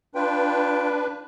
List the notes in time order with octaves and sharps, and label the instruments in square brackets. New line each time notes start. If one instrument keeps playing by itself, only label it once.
[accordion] D4 B4 [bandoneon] F4 G5